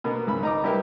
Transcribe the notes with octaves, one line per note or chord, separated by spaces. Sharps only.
B2 A#3 B3
G#1 C#2 B5
D#4 A#5 D6
G3 E4 G4 A#4 B4